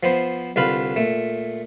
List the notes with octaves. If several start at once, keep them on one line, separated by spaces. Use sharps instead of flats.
F3 B3 C5
C2 D3 F4 B4 F5 B5
A#2 A3